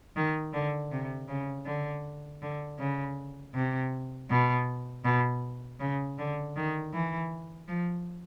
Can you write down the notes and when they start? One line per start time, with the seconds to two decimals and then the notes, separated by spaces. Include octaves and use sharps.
0.16 D#3
0.53 D3
0.92 C3
1.28 C#3
1.66 D3
2.42 D3
2.79 C#3
3.55 C3
4.30 B2
5.05 B2
5.80 C#3
6.18 D3
6.56 D#3
6.93 E3
7.68 F3